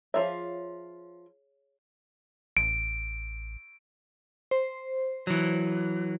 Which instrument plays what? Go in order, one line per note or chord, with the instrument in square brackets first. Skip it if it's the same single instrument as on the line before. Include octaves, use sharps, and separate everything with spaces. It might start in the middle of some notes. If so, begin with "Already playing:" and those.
[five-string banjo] F3 F4 E5 [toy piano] G#4 C#5
[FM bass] A1 [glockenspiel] D7
[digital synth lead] C5
[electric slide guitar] E3 F#3